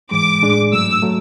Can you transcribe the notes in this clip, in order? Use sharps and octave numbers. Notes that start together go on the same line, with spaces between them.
G#2 E3 G#3 D6
A2 G#3 D4 G#4 D5
G#2 F#3 A3 E6
F#3 A3